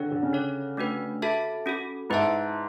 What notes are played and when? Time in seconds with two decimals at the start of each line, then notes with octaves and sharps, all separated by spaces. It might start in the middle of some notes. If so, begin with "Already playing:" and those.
Already playing: D3 D4 G#4 C#5
0.11 D3
0.23 C#3
0.33 D4 A4 C#5
0.77 A3 D4 F#4 B4
1.22 F#4 A4 E5 A5
1.66 C#4 F#4 A4
2.10 G#2 E4 B4 E5 A5